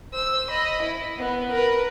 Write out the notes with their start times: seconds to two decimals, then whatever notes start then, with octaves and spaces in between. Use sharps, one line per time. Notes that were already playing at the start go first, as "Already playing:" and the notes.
0.13 C5 E6
0.51 D#5 B5
0.83 E4
1.19 B3
1.52 A#4 B4